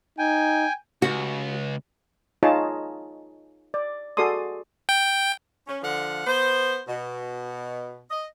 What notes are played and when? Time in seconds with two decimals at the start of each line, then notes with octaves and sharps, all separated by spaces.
0.18 D#4 G5 G#5
1.02 C#2 F#4
2.43 D#4 F4 G#4 C#5 D#5 A5
3.74 D5
4.17 F#4 G#4 A4 D5 C6 D#6
4.89 G5
5.67 C#4
5.82 D3 F3 F5 F#5
6.27 B3 C5
6.87 B2
8.09 D#5